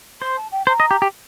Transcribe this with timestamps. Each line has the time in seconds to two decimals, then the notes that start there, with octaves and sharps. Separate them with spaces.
0.21 C5 C6
0.37 A5
0.52 G5
0.67 C5 A#5
0.80 D#5
0.91 G4
1.02 G4